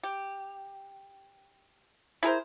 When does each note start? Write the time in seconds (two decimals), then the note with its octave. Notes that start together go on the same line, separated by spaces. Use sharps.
0.03 G4
2.23 E4 G#4 A#4 C5